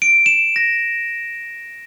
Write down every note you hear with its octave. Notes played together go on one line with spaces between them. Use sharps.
D7
E7
A#6